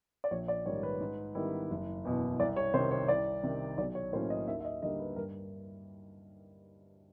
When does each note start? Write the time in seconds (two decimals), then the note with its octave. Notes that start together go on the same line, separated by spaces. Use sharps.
0.24 D5
0.31 A#1 C#5
0.48 D5
0.66 G#2 D#3 G3 C#5
0.83 B4
1.00 G#2
1.35 D#3 G3 B3 E4
1.70 F#1
2.05 E2 B2
2.40 C2 D5
2.56 C#5
2.74 C3 C5
2.78 D#3
2.91 C#5
3.08 C2 D5
3.43 C3 D#3
3.78 B1 D5
3.95 C#5
4.13 A2 F#3 A#3 C#4 C5
4.30 D#5
4.48 D#2 E5
4.60 E5
4.65 D#5
4.82 D3 G3 A#3 D#4 D#5
4.99 B4
5.16 G2 A#4